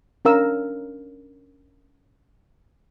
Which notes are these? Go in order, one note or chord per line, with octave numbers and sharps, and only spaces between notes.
C#4 D4 A#4 F5 E6